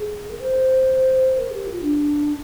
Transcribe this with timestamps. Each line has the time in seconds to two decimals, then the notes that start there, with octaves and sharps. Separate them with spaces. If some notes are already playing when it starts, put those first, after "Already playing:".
Already playing: G#4
0.30 A#4
0.40 C5
1.35 A#4
1.51 G4
1.67 F4
1.82 D4